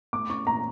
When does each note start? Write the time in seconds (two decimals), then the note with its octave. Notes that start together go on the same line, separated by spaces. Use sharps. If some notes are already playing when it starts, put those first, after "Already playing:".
0.13 A3 D6
0.30 C#4 C#6
0.47 A#2 A#5